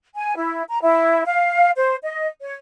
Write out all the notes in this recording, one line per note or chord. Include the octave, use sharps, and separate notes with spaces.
G#5
E4
A#5
E4
F5
C5
D#5
C#5